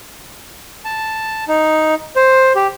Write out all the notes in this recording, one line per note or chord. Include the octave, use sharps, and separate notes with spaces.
A5
D#4
C5
G4